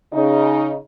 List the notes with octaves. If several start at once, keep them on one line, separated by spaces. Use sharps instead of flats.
C#3 D#4